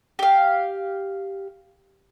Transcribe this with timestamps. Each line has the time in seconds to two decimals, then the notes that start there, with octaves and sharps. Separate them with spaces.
0.19 G4 F5